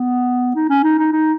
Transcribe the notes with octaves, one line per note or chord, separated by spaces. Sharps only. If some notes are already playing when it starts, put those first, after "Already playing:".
Already playing: B3
D#4
C#4
D#4
D#4
D#4